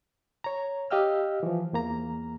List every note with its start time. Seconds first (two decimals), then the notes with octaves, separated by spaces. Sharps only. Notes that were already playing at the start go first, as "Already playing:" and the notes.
0.44 C#5 A#5
0.91 G4 D#5 F5 G5 E6 F6
1.43 E3 F3
1.73 E2 A#3 A#5